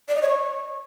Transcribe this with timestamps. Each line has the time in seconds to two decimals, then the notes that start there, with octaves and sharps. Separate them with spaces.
0.08 D5
0.15 D#5
0.22 C#5
0.29 C#6